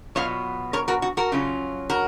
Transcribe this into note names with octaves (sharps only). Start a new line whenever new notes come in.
B2 F#3 B3 F4 C#5 F5
A#4 C#5
F#4 A#4
F#4
F#4 A#4
C#3 F#3 C#4 F4
F#4 A#4